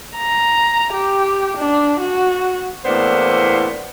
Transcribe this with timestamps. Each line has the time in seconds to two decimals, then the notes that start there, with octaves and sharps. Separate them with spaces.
0.17 A#5
0.93 G4
1.58 D4
2.00 F#4
2.85 E2 A2 A#3 B3 D4 C5